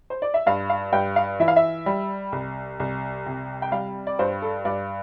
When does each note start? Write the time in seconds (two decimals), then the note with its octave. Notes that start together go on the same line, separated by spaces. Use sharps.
0.10 C5
0.22 D5
0.34 E5
0.46 G2 F5
0.70 F5
0.92 G2 G5
1.16 F5
1.40 E3 E5
1.48 F5
1.56 E5
1.86 G3
2.32 C2
2.80 C2
3.26 C3
3.62 G5
3.72 G3 F5
4.07 D5
4.19 G2 C5
4.42 A4
4.65 G2 D5